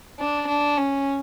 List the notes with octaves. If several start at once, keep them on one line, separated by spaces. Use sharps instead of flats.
D4
D4
C#4